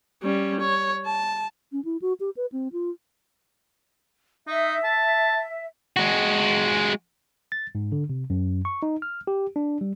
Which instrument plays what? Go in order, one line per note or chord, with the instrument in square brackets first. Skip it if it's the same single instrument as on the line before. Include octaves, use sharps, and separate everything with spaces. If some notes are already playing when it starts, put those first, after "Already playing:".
[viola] G3 C#4
C#5
A5
[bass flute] C#4
E4
F#4
G4
B4
C4
F4
[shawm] D#4 [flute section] E5
[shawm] A5
[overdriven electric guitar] G#3 F#4
[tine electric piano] A6
G#2
D3
C3
F#2
C#6
D#4
F6
G4
D4
G3